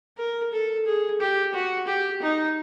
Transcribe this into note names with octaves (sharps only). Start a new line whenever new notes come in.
A#4
A4
G#4
G4
F#4
G4
D#4